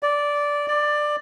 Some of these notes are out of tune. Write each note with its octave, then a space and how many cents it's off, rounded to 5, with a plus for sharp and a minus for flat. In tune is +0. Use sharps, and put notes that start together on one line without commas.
D5 -10
D5 +15